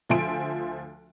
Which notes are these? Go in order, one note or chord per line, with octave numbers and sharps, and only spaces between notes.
D2 F3 E5 G#5 C6 D7